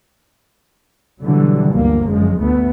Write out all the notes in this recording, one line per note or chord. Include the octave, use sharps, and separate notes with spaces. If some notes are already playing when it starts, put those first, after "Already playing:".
B2 D3 E3 F#3 G3
G1 D2 A#3
F#2 F3 G#3
D2 A3 B3